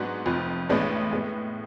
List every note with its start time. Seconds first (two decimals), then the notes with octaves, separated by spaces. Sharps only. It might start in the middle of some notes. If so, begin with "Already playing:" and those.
Already playing: G#2 F#3 B3 D4 F#4
0.26 F1 F2 F3
0.69 A1 A2 G#3 B3 D4
1.11 A2 G#3 B3